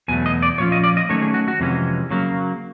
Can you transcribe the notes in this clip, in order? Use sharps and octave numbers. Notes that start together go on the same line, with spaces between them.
E2 B2 F#3 A3 G#5
D#5
D5
A#2 F3 C#4 F4 C#5
D#5
D5
D#5
D#3 F#3 A3 C#4 C#5
G#4
F#4
F#4
F2 C3 E3 G#3 C#4
C#3 F#3 A#3